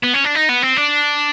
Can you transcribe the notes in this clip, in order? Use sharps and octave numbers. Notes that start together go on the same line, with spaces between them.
B3
C#4
D4
D#4
B3
C4
D4